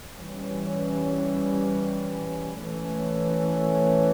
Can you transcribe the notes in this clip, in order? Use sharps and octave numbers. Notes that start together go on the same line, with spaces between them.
E3 G3 C#4
E3 A3 C#4